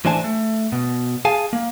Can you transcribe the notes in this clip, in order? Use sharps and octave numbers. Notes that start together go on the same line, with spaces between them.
A2 E3 D4 C5 G#5 A5
A3
B2
G#4 F5 G#5 A5
A#3